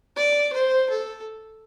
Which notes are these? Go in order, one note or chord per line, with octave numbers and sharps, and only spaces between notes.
D5
C5
A4